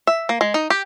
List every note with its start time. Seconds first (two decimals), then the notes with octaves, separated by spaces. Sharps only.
0.07 E5
0.29 A#3
0.41 G#3
0.54 D#4
0.70 G4